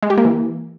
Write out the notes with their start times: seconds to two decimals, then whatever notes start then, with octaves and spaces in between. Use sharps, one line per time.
0.03 G#3
0.10 G4
0.18 A#3
0.25 E3